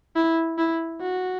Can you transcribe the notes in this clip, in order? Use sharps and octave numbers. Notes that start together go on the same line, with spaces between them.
E4
E4
F#4